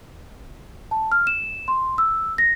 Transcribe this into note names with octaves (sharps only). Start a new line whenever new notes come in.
A5
F6
E7
C6
E6
A#6